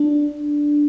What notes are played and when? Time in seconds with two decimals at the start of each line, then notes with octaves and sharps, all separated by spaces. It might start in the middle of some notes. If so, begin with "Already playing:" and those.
Already playing: D4